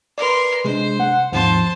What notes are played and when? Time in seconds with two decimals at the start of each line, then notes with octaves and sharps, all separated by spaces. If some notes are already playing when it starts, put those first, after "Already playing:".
0.18 A#4 B4 D5 C6
0.65 C3 G#3 D4 C5
1.00 F#5
1.32 D#2 G#2 F3 C4 C5 A5